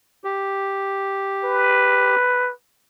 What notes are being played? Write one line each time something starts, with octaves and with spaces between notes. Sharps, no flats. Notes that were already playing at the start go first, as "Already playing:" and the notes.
G4
B4